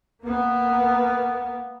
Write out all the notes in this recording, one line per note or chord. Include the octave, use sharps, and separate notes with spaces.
A#3 B3